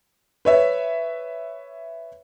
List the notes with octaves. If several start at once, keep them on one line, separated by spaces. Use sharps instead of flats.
B4 C#5 E5